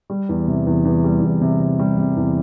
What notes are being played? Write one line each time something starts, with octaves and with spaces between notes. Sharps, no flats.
G3
E2
C3
E2
E2
G3
E2
C3
C3
G3
C3
E2